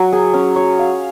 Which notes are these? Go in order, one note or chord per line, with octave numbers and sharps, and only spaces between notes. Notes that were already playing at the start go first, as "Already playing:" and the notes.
Already playing: F#3
G#4
C#4
C#5
F5